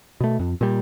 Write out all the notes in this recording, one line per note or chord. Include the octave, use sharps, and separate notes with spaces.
B2 A3
F2
A#2 G3